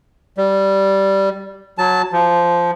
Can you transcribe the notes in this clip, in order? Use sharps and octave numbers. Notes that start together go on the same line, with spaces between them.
G3
F#3 A5
F3